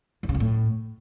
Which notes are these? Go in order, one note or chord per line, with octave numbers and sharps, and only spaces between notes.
E3
C#3
F2
A2